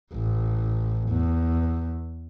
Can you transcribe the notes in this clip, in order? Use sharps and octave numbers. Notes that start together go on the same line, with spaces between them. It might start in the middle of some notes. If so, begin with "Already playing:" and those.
A1
E2